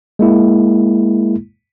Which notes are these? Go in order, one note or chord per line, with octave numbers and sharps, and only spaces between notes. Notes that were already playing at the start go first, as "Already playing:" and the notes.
G#3 A#3 E4